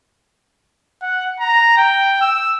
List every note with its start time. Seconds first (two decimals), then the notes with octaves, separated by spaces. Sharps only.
1.02 F#5
1.40 A#5
1.78 G5
2.21 E6